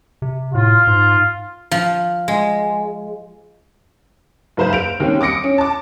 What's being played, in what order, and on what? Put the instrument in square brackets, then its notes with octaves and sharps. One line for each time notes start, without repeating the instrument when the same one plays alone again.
[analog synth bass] C3
[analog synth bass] A2 [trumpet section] F4
[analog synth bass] G#2
[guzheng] F3
G#3
[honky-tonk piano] F#1 G#2 B4 C5 F5 G6
D7 F7
D#2 G3 C4 C#4
D6 D#6 A#6 C#7 D7
C#4
A5 D6